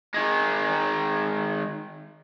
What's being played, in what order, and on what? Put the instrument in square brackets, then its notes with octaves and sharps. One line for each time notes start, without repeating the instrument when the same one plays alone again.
[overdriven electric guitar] D#3 G#3